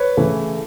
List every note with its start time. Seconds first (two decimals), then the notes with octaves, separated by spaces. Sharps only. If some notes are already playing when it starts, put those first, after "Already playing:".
Already playing: B4 C#5
0.17 C#3 E3 A3